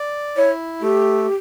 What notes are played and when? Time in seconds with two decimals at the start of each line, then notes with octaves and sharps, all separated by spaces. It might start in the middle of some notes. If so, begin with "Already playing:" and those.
Already playing: D5
0.37 E4 C#5
0.82 A3 G4